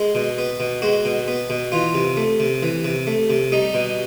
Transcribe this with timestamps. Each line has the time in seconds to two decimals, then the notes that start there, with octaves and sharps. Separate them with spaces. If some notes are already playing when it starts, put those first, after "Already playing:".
Already playing: G#3
0.15 B2
0.38 B3
0.60 B2
0.82 G#3 F#4
1.05 B2
1.28 B3
1.50 B2
1.72 E3 F4
1.95 C3
2.17 A3
2.40 C3
2.63 E3
2.85 C3
3.07 A3
3.30 C3
3.52 G3 D#4
3.74 B2